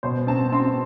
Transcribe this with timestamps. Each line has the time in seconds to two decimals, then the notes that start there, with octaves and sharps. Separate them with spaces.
0.03 B2 C5
0.27 C4 A5
0.52 C4 C6